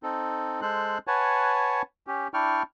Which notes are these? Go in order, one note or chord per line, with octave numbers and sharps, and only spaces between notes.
C4 D#4 A4
G#3 A4 C5 F#6
B4 C#5 F#5 G#5 A5
C#4 G4
D4 E4 D5 G5 C#6 F6